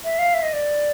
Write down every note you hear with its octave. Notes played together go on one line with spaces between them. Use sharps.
E5
F5
E5
D#5
D5